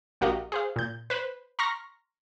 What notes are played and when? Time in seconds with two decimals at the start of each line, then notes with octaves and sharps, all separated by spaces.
0.21 A#1 F#4 G4 A#4 D#5 F5
0.52 G#4 C5 F5
0.76 A#2 G6
1.10 B4 C5 B5
1.59 A#5 C6 C#6 F6 A#6